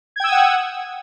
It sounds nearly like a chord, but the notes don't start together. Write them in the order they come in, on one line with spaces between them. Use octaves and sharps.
G#6 G5 E6 D#6 F#5